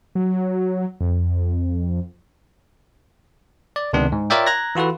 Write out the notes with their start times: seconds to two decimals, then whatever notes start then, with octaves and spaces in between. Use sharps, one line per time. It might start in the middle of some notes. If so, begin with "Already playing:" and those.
0.15 F#3
1.01 F2
3.76 D5
3.93 C#2 C3 D#3 B3 D4
4.12 G#2
4.30 F4 A#4 C#5 D5 E5 G5
4.47 A#5 F#6 G#6 A#6
4.75 E3 F4 F#4 A4 B4